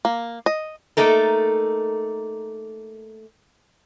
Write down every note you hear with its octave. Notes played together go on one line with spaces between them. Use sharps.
A#3
D#5
A3 A#3 D#4 A4 A#4